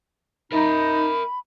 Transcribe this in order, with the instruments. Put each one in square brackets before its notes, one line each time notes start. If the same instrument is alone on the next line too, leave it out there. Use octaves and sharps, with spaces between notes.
[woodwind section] D#4 [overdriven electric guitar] A#4 E5 [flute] B5